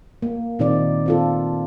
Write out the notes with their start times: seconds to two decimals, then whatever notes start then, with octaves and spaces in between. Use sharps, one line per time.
0.22 A#3
0.59 A#2 D#3 C4 D#4 D5
1.06 C4 F4 A4